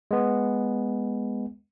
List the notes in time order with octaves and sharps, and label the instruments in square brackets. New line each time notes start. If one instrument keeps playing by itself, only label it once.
[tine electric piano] G#3 B3